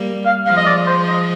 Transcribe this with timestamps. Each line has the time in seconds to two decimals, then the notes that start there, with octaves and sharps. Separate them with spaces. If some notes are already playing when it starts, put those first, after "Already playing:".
Already playing: G3 A#3
0.25 F5
0.46 F3 G#3 F5
0.57 D#5
0.67 D5
0.87 C5
1.08 D#5